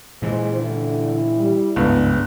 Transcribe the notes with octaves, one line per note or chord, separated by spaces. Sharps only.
A#2 E3 G#3 C5
D3 E4
G3
G1 C#2 G#2 D4 B4